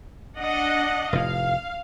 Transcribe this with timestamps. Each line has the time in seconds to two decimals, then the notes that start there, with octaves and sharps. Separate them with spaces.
0.37 D4 D#5 F#5
1.13 F1 A2 F5